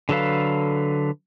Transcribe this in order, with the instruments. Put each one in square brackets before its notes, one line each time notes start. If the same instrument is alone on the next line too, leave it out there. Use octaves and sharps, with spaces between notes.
[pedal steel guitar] D3 F#3 A4 B4 F5